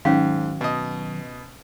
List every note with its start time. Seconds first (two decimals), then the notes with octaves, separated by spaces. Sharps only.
0.05 G#2 D#3 F#3 C#4 F5
0.61 B2 D#5